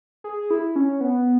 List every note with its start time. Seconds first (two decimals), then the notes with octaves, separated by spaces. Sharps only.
0.24 G#4
0.50 E4
0.76 C#4
1.01 B3